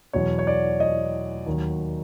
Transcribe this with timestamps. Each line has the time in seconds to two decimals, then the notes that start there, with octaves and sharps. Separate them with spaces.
0.13 E2 B2 F#3 C#5
0.39 C#5
0.47 D5
0.80 D#5
1.46 D#2 D#3 F#3